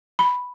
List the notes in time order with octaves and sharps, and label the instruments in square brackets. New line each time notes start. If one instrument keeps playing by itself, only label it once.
[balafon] B5